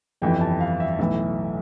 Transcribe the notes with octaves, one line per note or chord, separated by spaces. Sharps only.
G1 F2 E3 G3 G5
A5
F5
E5
B1 A2 E3 E5